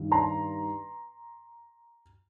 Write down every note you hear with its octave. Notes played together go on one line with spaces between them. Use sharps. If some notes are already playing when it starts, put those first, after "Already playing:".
Already playing: G2 D#3
A#5 C6